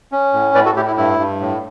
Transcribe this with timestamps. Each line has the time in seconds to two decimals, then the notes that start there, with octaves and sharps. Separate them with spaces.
0.12 C#4
0.33 A2
0.55 A2 B4 D5
0.65 F#4 A4
0.76 A2 E4 G4
0.87 E4
0.97 G2 E4
1.19 G2
1.41 A2